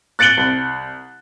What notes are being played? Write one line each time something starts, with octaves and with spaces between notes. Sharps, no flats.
F#6 A6 C#7 D7 F#7 G7
C2